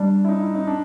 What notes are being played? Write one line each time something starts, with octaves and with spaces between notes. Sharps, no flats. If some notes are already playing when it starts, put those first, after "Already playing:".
Already playing: G3 D4
E4
D#4
E4
D#4
D4